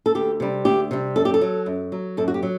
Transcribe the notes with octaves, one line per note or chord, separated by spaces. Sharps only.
A4
D2 G4
C3 G3
D2 G4
C3 G3
F#2 A4
G4
A4
F#3
F#2
F#3
F#2 A4
F#4
G4
F#3